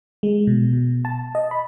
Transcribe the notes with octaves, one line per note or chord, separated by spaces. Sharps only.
G#3
B2
B2
A5
D#5
B5